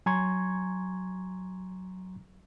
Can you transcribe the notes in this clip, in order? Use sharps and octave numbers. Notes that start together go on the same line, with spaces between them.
F#3 G#5 A#5 C6 C#6 G#6